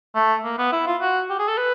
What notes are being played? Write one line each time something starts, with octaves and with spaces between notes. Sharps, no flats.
A3
A#3
B3
E4
F4
F#4
G4
G#4
A4
B4